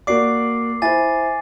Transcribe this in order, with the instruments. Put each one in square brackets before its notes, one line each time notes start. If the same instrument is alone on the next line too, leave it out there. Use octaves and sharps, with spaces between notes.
[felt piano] A#3 F#4 D5 [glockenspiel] D6 C7
[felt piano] E4 C5 [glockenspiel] G#5 A6